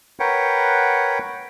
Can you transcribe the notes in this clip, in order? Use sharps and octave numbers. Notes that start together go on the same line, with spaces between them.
A#4 B4 C#5 F#5 G5